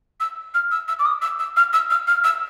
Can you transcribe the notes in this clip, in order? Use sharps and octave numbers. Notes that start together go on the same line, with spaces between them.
E6
F6
E6
E6
D6
D#6
E6
E6
F6
E6
F6
F6
E6